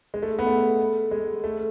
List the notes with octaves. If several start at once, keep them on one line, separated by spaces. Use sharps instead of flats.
G#3
A3
B3
A3
G#3
A3